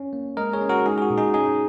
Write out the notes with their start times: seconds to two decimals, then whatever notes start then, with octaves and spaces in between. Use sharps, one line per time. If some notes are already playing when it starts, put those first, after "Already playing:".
Already playing: C#4 C#5
0.13 A#3
0.37 G#3 A#4 D#5
0.53 G#4 C#5
0.61 C#4
0.69 F#4 A#4
0.86 G#3 D#4 G#4
0.98 G#4
1.02 F#4
1.10 A#2
1.17 D#4 G#4
1.34 C#4 D#4 G#4